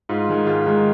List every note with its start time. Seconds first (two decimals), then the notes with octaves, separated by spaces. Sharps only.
0.09 G#2 F4
0.29 D#3 G#3
0.47 G#2 F4
0.66 D#3 G#3